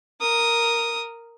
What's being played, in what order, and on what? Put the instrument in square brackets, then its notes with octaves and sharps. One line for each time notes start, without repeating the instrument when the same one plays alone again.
[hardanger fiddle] A#4 D#6